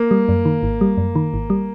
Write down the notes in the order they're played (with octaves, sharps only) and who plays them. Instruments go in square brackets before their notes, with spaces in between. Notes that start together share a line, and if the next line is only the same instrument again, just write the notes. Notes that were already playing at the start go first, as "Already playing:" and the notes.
Already playing: [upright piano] A#3
[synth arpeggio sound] G3
F#2
D#3
G#1
G3
F#2
D#3
G#1
G3